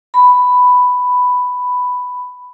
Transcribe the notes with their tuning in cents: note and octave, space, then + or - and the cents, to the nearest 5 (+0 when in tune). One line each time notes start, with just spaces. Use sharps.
B5 +5